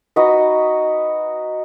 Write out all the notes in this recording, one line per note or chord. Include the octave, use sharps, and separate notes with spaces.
D#4 F#4 B4 D#5